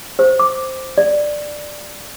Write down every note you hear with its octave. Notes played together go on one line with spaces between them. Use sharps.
C5
D6
D5